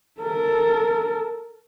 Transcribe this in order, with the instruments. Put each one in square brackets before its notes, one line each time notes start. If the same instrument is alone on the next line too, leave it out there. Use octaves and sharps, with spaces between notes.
[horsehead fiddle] A4 A#4